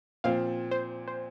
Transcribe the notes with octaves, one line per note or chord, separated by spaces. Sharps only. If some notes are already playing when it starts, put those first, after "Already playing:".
A#2 F3 C4 F5
C5
C5